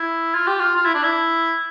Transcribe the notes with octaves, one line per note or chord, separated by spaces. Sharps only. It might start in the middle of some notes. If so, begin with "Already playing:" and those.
Already playing: E4
F4
G4
F4
F4
E4
D4
E4